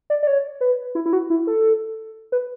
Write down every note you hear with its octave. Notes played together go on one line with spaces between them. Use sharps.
D5
D5
C#5
B4
E4
E4
F#4
E4
A4
B4